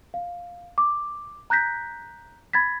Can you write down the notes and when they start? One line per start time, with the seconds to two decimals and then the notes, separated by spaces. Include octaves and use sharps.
0.14 F5
0.78 D6
1.50 A#5 F#6 G6 A#6 B6
2.53 B5 G#6 A6 B6